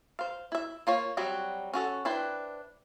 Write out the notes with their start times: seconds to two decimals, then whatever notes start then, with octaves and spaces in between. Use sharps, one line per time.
0.19 C5 F5
0.52 E4 E5
0.87 A#3 F4 C#5
1.17 F#3 G3 C4 F#4
1.74 C#4 F#4 A4
2.05 D4 E4 B4 C5 G5